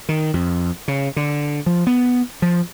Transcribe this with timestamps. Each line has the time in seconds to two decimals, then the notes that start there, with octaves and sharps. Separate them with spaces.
0.09 D#3
0.34 F2
0.88 C#3
1.16 D3
1.66 F3
1.87 B3
2.42 F3